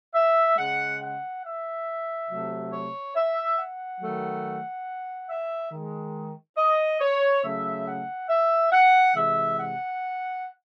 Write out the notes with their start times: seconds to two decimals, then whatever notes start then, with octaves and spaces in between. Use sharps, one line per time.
0.14 E5
0.58 C#3 G#3 F#5
1.01 F#5
1.44 E5
2.29 C3 F#3 A3
2.73 C#5
3.16 E5
3.58 F#5
4.01 D#3 F#3 A3
5.30 E5
5.72 D#3 G#3
6.57 D#5
7.01 C#5
7.44 C#3 F#3 A3 E5
7.87 F#5
8.29 E5
8.72 F#5
9.15 C3 E3 G#3 E5
9.58 F#5